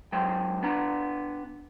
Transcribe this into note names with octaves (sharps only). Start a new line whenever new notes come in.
G#2 F#3 G#3 C5 G5
B3 D4 A#5